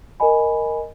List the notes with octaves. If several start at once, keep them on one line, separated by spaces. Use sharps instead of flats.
A#4 D#5 G#5 B5